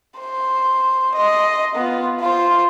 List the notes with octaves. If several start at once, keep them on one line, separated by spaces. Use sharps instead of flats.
C5
D#5 C6
B3 F4
F4 C5